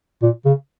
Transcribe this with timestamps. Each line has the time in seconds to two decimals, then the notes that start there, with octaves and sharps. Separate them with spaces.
0.22 A#2
0.45 C#3